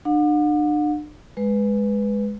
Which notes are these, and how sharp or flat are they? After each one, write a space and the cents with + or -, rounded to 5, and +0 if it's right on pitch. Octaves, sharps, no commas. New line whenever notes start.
D4 +40 F#5 -40
G#3 +0 B4 +0